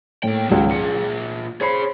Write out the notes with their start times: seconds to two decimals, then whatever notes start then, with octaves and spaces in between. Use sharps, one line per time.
0.23 A2 A#3 G5
0.50 G#1 C#2 F#3
0.71 A#2 G#4 C#7
1.61 G#4 C5 C#5 B5 C7